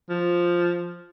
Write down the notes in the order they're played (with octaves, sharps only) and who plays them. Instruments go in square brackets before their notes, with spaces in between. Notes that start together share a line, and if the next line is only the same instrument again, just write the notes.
[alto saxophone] F3